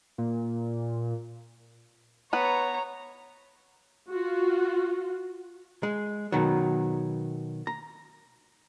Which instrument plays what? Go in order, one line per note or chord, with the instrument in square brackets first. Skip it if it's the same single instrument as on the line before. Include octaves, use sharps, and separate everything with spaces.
[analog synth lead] A#2
[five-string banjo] B3 B4 [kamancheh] C#5 A#5
[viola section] F4 F#4
[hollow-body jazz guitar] G#3
B2 D#3 F#3
A#5